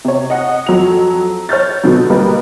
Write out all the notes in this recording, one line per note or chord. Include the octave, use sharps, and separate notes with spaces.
C3 C#5
D#5 F#5
F2 F#3 F7
C#5 F6 G6 A6
B2 D3 F#3
G3 A#3 A#4 B4 D#5